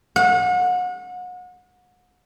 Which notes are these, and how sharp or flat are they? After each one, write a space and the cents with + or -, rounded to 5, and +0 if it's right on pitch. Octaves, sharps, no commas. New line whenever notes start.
F#5 -35